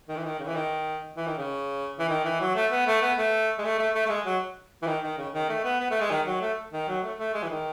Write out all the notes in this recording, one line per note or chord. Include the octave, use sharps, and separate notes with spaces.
D#3
E3
D#3
C#3
E3
D#3
E3
D#3
C#3
E3
D#3
E3
F#3
A3
B3
A3
B3
A3
G#3
A3
A3
A3
A3
G#3
F#3
E3
D#3
D#3
C#3
D#3
A3
B3
B3
A3
G#3
D#3
F#3
A3
D#3
F#3
A3
A3
G#3
E3
D#3